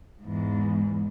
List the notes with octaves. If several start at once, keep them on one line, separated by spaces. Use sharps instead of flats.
E2 G#2